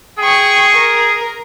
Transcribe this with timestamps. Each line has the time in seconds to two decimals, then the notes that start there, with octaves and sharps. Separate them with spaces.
0.19 G#4 G5 C#6
0.77 A#4